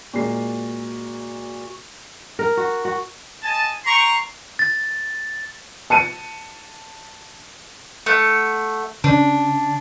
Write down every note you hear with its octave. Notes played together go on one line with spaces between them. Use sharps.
A#2 G#3 F#4 C7
A#4
F#4
F#4
D#5 G#5 A5
G5 A#5 C6 C#6
A6
A5 C#7 D#7
A3 F#5
C#3 D4